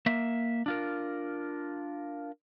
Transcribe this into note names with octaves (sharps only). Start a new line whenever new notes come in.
A#3 E5
D4 F4 A#4